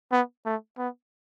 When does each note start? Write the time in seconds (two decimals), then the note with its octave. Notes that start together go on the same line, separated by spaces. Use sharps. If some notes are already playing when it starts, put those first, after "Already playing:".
0.12 B3
0.45 A3
0.78 B3